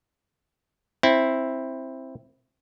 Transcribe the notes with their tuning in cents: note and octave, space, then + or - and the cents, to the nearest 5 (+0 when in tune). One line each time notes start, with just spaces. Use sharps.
C4 +10 E4 +0